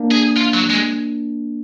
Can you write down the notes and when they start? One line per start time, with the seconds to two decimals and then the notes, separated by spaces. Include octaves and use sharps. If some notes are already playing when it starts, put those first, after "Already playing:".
Already playing: A#3 D4
0.11 G#4
0.36 F4
0.54 F#3
0.70 G#3